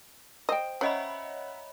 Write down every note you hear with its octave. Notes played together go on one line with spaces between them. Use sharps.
C5 D#5 G5
C#4 C#5 D#5 E5 F#5 A#5 B5